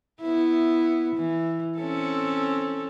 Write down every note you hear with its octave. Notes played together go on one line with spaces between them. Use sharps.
B3 E4
E3
C4 C#4 A4